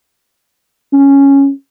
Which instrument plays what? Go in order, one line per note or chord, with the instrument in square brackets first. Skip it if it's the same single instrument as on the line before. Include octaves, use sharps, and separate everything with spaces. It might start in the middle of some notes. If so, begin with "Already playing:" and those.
[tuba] C#4